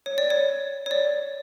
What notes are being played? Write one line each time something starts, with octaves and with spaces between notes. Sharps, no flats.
C#5
D5
C#5
C#5
D5